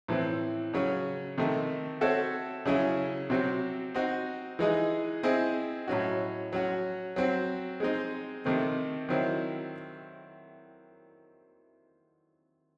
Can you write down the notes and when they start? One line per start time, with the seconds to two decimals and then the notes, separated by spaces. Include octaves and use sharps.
0.08 A2 E3 C4
0.73 C#3 F#3 C#4
1.38 C3 D#3 A3 D#4
2.01 C4 F#4 A4 C#5 E5
2.65 C#3 F#3 C#4 E4 G#4
3.30 C3 F#3 C4 F#4
3.94 C4 D#4 F#4
4.59 E3 G#3 D#4 G#4
5.23 C4 E4 G#4 D#5
5.88 A2 F#3 C#4 F#4
6.53 F#3 C#4 F#4
7.16 F#3 C4 F#4
7.80 G#3 C4 D#4
8.45 C3 D#3 A3 C4
9.09 D#3 F#3 C4 E4